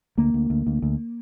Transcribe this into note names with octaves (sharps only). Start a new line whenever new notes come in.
D2 A#3
D2
D2
D2
D2